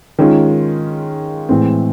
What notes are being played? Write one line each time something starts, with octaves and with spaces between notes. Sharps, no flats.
D#3 G#3 C#4 F4
A2 E3 G#3 C4